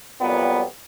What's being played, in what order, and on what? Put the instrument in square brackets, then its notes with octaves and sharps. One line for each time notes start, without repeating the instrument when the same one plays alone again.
[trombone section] F2 A#2 F#3 G3 B3